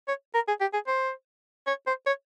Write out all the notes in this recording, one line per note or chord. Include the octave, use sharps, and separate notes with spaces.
C#5
A#4
G#4
G4
G#4
C5
C#5
C5
C#5